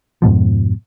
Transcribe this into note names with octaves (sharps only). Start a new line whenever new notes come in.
F2 G#2 B2 F3